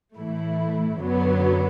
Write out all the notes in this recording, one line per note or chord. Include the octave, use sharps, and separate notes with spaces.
A2 E3 A3 E4
F#2 D3 F#3 B3